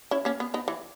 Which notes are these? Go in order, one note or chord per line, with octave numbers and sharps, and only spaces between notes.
C#4 E4
A#3 C#4
B3
B3 D#4
E3